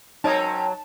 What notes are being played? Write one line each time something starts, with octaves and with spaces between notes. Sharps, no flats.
F#3 C4 C#4 D#4 A#4 C#5 D#5 A5